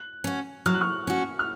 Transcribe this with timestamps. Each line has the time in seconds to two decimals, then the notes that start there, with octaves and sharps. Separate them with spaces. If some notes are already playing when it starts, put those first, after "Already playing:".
Already playing: F#6
0.24 C#4 F#4
0.66 F#3 F6
0.74 F#6
0.81 C#6 F6
1.07 C#4 F#4
1.39 F6